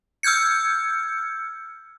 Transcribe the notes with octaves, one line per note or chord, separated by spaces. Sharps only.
E6 F6 G6 G#6 C#7